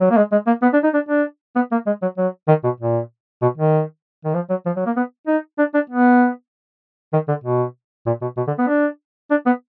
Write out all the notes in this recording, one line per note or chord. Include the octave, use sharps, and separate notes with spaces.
F#3
A#3
G#3
G#3
A#3
B3
D4
D#4
D4
D4
B3
A#3
G#3
F#3
F#3
D#3
B2
A#2
B2
D#3
D#3
F3
F#3
F3
F#3
A#3
B3
D#4
D4
D4
B3
D#3
D3
B2
A#2
B2
B2
D3
B3
D4
D4
B3